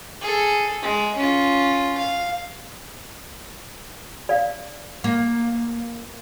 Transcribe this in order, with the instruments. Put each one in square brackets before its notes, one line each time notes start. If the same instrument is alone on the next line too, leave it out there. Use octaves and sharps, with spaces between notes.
[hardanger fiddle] G#4 A4
G#3
C#4 F4
F5
[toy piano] D5 F5
[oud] A#3